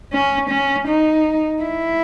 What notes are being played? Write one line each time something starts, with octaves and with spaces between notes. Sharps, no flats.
C#4
C#4
D#4
E4